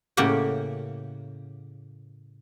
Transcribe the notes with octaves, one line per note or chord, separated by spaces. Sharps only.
A2 C#3 A#3 G4 F#5